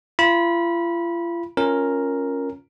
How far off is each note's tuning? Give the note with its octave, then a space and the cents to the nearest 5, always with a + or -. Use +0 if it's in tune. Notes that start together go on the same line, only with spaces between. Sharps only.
F4 -40 B5 -25
C#4 +0 F4 +0 A#4 +0